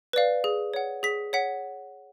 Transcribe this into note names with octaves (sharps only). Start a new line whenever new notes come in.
B4 D5 F5
G#4
C#5 F#5
G#4 B6
C#5 F#5 B6